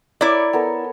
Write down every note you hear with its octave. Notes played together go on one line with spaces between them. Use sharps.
E4 A#4 C#5 D5
B3 A4 A#4